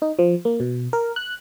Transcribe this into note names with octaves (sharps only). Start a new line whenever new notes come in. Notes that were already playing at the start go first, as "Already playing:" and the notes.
D#4
F3
A#3
B2
A#4
F#6